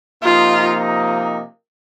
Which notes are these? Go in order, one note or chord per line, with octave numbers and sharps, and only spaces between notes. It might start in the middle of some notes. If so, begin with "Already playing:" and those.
C3 F3 A#3 D#4 F4